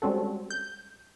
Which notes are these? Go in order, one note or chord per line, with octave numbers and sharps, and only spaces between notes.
G3 G#3 C4 C#4 F#4 A4
G6